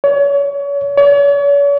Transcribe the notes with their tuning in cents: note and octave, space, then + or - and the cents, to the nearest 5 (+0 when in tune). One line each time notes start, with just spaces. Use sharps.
C#5 +35
C#5 +45